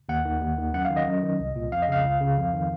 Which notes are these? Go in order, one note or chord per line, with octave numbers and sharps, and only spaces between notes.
D#2 F#5
D#3
D#2
D#3
F#2 F#5
F5
D#3
D#5
F#2
D#3
C2
A#2
F2 F5
D#5
C#3 F5
C#2
C#3
F2
D#3